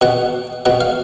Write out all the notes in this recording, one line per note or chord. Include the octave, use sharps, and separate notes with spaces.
B2 F#5
B2 F#5
F5